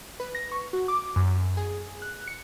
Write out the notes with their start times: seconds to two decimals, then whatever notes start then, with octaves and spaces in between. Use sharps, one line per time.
0.20 B4
0.35 A#6
0.52 C#6
0.73 F#4
0.88 D6
1.16 F#2
1.57 G#4
2.02 F#6
2.27 C#7